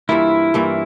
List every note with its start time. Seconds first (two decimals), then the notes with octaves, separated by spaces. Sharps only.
0.09 G2 E3 A#3 E4 F4
0.54 G2 E3 A#3 F4